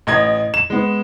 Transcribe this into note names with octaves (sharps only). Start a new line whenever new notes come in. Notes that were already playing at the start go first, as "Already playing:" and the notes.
A1 D#5 G#6
E7
G#3 B3